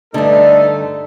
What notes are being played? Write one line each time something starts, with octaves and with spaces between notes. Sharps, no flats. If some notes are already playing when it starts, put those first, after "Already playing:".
G2 D3 A3 D#4 A4